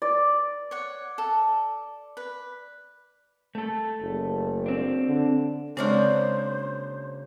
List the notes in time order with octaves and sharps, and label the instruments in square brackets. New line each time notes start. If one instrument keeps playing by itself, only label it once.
[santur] D5
[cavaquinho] C#5 F#5
A4
B4
[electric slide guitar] A3 A4
[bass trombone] F#1
[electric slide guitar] C4 D4
[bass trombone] D3
[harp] C#3 F6 [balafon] G#3 C4 [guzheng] A#3 D4 F#4 [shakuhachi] C5